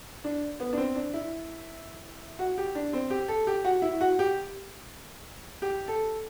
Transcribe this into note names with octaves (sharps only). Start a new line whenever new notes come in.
D4
B3
D4
C4
D4
E4
F#4
G4
D4
C4
G4
A4
G4
F#4
E4
F#4
G4
G4
A4